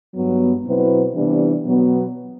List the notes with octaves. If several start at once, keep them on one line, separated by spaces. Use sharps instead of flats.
G2 F#3 B3
B2 F#3 C4 E4 B4
C3 E3 G3 B3 D4
B2 F#3 B3